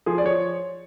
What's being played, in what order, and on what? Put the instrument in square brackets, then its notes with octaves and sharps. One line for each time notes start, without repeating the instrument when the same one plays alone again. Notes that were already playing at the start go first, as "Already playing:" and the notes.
[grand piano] F3 G#4
D5
F3 C#5